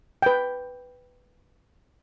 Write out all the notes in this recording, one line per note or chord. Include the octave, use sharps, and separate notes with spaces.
B4 G5